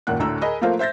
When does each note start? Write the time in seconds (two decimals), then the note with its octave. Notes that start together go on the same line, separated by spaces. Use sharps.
0.07 F#1 D#2 A#2 F#5 F#6
0.19 D2 A2 D3 A#5 E6
0.41 G#4 A#4 D#5 B5
0.61 F3 A3 A#3 F4 A#4 C5
0.79 C5 E5 G6 A6 A#6